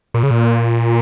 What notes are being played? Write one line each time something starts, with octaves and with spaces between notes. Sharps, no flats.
A#2
C#3
A#2